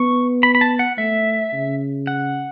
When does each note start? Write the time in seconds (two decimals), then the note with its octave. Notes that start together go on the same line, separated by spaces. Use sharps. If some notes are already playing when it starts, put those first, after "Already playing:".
Already playing: B3 C#6
0.43 B5
0.55 B5
0.61 A5
0.79 F#5
0.98 A3 E5
1.53 C#3
2.07 F#5